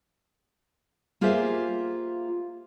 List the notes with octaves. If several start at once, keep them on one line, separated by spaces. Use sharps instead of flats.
A#3 F4 G4 G#4 C5 E5